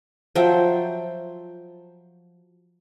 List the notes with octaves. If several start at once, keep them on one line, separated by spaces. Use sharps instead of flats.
F3 F#3 E5 G5